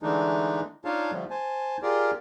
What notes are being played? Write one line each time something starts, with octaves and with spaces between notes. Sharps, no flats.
D3 E3 G#3 A3 D4 D#4
D4 D#4 F4 C#5 F5 A5
D3 F3 G3 A3
C5 G#5 A5
F4 G4 G#4 A#4 D5